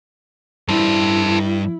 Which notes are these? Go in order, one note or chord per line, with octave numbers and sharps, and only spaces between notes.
G2 G3 E4 A4 C5